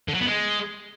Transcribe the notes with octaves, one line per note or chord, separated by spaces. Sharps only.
D3
F#3
B3
G#3